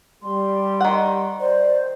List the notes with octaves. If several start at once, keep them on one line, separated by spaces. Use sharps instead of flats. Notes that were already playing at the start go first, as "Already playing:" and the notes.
G3 C6
D#3 F#5
C5 D5